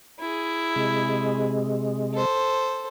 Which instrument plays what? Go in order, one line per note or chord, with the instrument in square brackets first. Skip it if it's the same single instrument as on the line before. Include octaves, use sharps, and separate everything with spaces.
[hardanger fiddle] E4 G#4
[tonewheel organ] C3 G#3
[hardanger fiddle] A4 C5